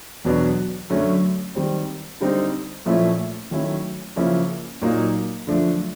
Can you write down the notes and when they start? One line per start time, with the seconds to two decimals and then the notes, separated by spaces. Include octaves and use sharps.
0.25 E2 B2 F#3 B3 D4
0.90 F#2 D3 F#3 A3 C#4
1.55 D#3 G3 C4
2.21 D3 G3 C4 D#4
2.86 A#2 F3 A3 C#4 E4
3.51 D#3 F#3 A3 C#4 E4
4.16 C#3 F3 A#3 C#4 E4
4.82 A#2 F#3 A#3 D#4
5.47 F#2 D3 F3 A3 D4